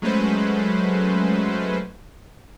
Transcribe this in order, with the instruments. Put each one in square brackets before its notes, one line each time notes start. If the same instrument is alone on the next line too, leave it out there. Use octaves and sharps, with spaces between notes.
[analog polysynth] F#3 G#3 A3 C#4 B4 C5